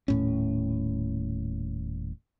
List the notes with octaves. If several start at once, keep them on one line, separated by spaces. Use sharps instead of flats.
D#1 A2 C#4